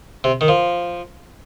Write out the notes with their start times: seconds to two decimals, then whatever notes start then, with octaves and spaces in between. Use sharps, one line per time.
0.24 C3
0.41 D#3
0.48 F3